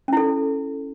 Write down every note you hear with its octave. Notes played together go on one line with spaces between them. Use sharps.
C#4 E4 A4